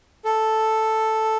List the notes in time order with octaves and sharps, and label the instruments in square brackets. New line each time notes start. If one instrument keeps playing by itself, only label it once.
[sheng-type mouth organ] A4